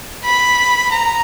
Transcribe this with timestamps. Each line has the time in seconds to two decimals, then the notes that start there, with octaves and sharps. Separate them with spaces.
0.24 B5
0.92 A#5